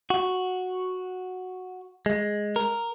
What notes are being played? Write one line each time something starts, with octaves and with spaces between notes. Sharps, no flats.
F#4
G#3
A#4